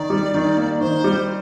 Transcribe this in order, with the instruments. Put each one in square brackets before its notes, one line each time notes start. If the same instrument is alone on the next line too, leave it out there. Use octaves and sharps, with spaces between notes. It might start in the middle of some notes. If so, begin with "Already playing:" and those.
Already playing: [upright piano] D#3 [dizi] D5
[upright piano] G3
D#3
A#3
[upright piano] D#3 [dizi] C5
[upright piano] G3